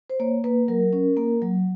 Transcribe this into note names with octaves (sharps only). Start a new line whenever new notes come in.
C5
A#3 C#5
A#3 B4
F#3 A#4
C#4
A#3
F#3